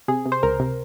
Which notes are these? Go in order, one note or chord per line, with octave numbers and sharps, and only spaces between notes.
C3 G#4
C3
C5
C#2 A#4
C3